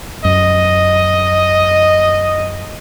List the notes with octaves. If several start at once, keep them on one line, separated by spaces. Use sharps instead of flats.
F#2 D#5